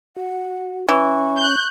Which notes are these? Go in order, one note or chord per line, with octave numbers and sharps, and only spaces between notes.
F#4 F#5
E3 C#4 C#6
F#6 G6